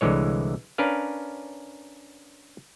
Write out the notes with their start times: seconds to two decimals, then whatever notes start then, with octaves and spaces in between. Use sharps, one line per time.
0.01 C2 D3 E3 G#3 C#5
0.78 C#4 D4 A#4 B4 F5